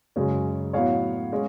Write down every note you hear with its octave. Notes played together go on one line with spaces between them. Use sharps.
F#2 C#3 G#3 C#4
A2 F#3 B3 C#5 F5
G#3 C#4